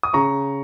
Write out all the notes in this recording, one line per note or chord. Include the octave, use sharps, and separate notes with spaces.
D#6
C#3 A#5 C#6